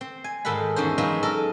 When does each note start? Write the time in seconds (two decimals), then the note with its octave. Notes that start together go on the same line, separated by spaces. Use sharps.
0.01 C4
0.24 G#5
0.45 G#2 D#3 A4 F#5 B5
0.76 E2 G#2 C#4 C5
0.98 F#3 G#3 B3 D#4 F4
1.23 A4 A#4 D#5